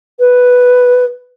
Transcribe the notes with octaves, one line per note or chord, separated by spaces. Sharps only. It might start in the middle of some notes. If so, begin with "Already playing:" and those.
B4